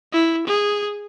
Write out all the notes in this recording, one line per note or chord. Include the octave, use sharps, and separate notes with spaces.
E4
G#4